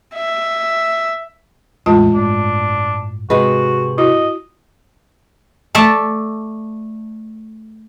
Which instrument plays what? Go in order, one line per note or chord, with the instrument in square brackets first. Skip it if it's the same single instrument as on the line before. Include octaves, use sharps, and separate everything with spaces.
[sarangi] E5
[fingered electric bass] E2 A2 [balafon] G#3 F4 A5
[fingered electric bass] G1 A2 [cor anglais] D4
[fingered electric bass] G#2 [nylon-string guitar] C3 G#4 B4 [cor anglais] F#4 [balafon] D#5
[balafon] E4 F#4 [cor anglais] D#5
[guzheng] A3 D5 E5 A5